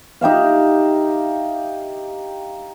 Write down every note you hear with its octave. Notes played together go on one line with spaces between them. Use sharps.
D#4 G4 E5 F5